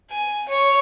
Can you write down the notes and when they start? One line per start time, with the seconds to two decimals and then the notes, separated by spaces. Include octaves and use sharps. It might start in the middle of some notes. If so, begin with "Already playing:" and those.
0.11 G#5
0.48 C#5